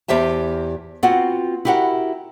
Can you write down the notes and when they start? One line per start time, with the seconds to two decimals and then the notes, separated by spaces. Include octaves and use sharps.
0.08 E2 G4 C5 E5 A5
1.03 B3 C4 F4 F#4 F#5
1.65 E4 F#4 G4 A#4 F#5